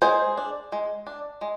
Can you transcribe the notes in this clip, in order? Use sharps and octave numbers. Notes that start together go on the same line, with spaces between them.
G#3 G#4 C5
D4
G#3
D4
G#3